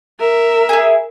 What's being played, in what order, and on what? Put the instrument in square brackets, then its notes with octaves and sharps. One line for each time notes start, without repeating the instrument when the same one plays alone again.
[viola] A#4 E5
[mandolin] E4 G#4